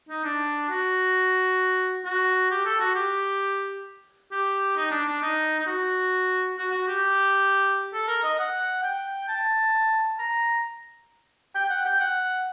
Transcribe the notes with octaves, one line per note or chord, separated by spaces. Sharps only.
D#4
D4
F#4
F#4
G4
A4
F#4
G4
G4
D#4
D4
D4
D#4
D#4
F#4
F#4
F#4
G4
A4
A#4
D#5
F#5
G5
A5
A#5
G5
F#5
G5
F#5